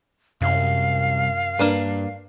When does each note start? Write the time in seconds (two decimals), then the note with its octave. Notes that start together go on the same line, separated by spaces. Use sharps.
0.42 C2 F#2 F5
1.59 G2 A#3 D4 B4